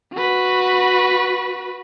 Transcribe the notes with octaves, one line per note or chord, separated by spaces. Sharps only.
F#4 B4